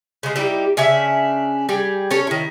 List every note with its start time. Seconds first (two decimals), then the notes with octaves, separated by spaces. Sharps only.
0.23 C#3 G#3
0.36 G3 D#4 E4 G4
0.77 C#3 C#4 D4 E5
1.69 G3 G4 G#4
2.11 C#4 A4 C#5
2.27 D#3 E4